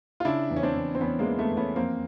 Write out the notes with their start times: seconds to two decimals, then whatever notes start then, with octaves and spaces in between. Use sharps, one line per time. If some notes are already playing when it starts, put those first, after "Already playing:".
0.20 F4
0.25 C#3 D4 E4
0.51 E2
0.56 C#4
0.63 C4 D4
0.76 E2
0.95 C4
1.00 E2 B3 C#4
1.19 G#3 A#3
1.26 E3
1.39 A3 B3
1.51 E2
1.57 B3 C#4
1.76 F2 A#3 C4